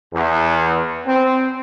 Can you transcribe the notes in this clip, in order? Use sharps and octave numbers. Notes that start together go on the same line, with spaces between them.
E2
C4